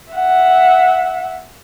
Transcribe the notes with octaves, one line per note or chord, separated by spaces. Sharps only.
E5 F#5